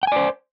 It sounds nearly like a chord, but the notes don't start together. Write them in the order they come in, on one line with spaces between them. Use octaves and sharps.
G5 G#5 D5 C5